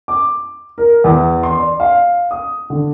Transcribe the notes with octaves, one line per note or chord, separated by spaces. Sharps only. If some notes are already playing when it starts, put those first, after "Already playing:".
D6
A#4
E2
C6
D5
F5
D#6
D3